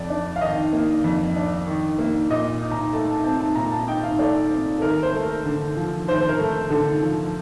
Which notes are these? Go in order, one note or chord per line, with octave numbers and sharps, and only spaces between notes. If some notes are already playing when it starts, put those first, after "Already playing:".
Already playing: F2 D5
D4
F5
D#3 D#5
A#3
F2
D4
D#3
A#3
A#2 D#5
D#4
A#5
A3 A5
A5
C4 A5
A5
A#2 A#5
A5
D#4 G5
F5
A3 D5
C4
A4
D#2 A#4
C5
A3
A#4
D3
F3
D#2 C5
C5
A#4
A3
D3 A4
F3